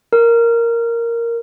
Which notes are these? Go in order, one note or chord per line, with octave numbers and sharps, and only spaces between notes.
A#4